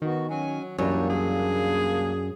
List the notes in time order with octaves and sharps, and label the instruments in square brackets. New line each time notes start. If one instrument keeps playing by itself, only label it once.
[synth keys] D#3 [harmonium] B3 F#4
[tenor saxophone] F#3 [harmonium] C#4 G#5
[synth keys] C2 E3 G3 [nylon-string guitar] F#2 [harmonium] A#3 D4 [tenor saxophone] C#5
[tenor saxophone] G#4